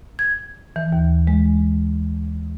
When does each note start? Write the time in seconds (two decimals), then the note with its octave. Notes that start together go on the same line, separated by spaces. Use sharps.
0.19 G#6
0.76 E3
0.92 D#2
1.27 G#3